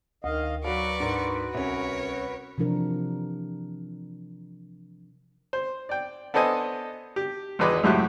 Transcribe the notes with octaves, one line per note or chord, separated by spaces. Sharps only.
D2 D#3 D#5 F5
F#3 F#4 B4 D5 F5 C#6
G#2 D4 A#4
C2 C#4 A#4 C#5
C3 E3 F3 D4 A#4
C5
D5 G5
B3 D4 A4 C5 D#5 G#5
G4
G#1 E2 G#3 B4 D#5 D6
C#2 F#2 A2 G4 E5 F#6